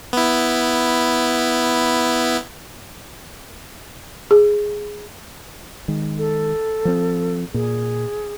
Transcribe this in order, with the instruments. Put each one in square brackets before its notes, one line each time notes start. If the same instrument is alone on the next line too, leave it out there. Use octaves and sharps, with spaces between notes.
[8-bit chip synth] B3 E4
[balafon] G#4
[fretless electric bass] D#3 G#3
[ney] A4
[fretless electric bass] F3 C4
[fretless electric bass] A#2 [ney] G#4